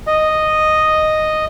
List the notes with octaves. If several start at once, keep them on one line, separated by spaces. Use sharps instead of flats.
D#5